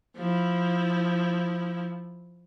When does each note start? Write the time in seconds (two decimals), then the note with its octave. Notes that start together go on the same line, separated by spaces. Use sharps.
0.17 F3 E4